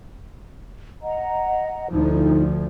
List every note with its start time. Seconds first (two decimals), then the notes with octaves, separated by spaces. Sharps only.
1.02 D#5 F#5 A#5
1.91 D2 D3 F3 D#4 E4